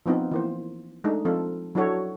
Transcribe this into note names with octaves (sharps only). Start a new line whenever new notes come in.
F3 B3 C4 D#4 F4
E3 A#3 C5
G#3 A3 D4 D#4
F3 C4 F4 A4
F#3 D4 E4 F#4 A4 C#5